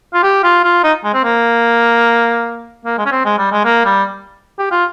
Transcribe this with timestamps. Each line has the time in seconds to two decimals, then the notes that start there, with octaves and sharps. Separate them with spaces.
0.14 F4
0.23 G4
0.43 F4
0.64 F4
0.84 D#4
1.04 G#3
1.14 C4
1.24 A#3
2.85 A#3
2.98 G#3
3.06 C#4
3.11 C4
3.25 G#3
3.38 G3
3.52 G#3
3.65 A#3
3.85 G3
4.59 G4
4.71 F4